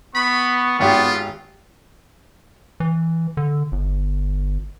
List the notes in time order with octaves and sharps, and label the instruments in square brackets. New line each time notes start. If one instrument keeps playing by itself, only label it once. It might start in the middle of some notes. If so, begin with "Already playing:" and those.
[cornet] B3 [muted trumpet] B5 [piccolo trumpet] C#6
[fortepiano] G#1 G4 [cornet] B3 [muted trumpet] F4
[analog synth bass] E3
D3
G1